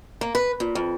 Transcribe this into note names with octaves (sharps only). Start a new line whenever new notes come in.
A#3
B4
A#2
F2